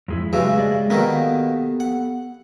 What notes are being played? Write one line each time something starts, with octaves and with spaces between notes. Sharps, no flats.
F2 G#3 E4
G2 C#3 E3 F#3 G#3
G#3 D5 D#5
B2 D#3 A#3 B3 G4 A4
F#5